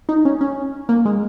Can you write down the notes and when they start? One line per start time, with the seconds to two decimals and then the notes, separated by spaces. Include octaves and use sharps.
0.09 D#4
0.25 C#4
0.41 C#4
0.89 A#3
1.05 G#3